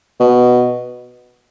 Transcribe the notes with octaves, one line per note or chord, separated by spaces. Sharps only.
B2